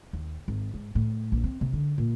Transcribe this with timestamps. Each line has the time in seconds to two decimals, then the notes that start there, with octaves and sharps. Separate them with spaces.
0.13 D#2
0.48 G#1
0.74 G#2
0.95 A2
1.32 A#1
1.44 C4
1.61 C3
1.73 D3
1.98 A#2